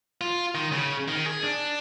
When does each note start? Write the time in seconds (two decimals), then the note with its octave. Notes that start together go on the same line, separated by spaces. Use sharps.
0.21 F4
0.55 D#3
0.72 C#3
1.08 D#3
1.26 G#4
1.43 D4